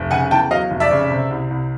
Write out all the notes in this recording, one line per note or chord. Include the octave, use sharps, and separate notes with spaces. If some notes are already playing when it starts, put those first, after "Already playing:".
Already playing: F1
C#3 F#5 G#5
E2 G5 A5
F#3 D#5 F5
F1
D5 E5
C#3
C3
C2
C2